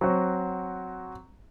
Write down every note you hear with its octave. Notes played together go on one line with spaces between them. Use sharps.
F#3 C4 F#4